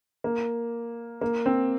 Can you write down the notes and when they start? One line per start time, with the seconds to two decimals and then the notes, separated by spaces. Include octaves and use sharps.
0.24 A#3
1.21 A#3
1.46 C4